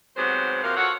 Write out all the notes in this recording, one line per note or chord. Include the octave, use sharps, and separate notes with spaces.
G#2 C3 F#3 B3 C5
C3 F3 A#3 F#4 A#4 F5
F4 F#4 A4 C#5 F#5